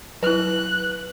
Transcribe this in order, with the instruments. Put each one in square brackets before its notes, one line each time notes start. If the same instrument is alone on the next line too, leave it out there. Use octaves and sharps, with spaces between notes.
[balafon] F#3 E4 [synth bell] B4 [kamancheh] F#6